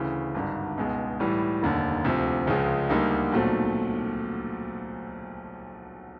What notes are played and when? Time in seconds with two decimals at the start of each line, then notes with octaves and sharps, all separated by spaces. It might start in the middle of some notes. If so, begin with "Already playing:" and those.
Already playing: D2 C#3 E3
0.34 G#1 G2 D3
0.77 C#2 B2 G#3
1.20 A2 E3 G3
1.62 F1 D#2 D3
2.04 D2 C3 F3
2.47 C#2 C#3 F3 G#3
2.89 D2 D3 G3 A#3 D#4
3.32 B1 A#2 F#3 A3 C4